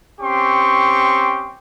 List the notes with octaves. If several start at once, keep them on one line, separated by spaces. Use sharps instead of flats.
C4 C#4 G4 C6 C#6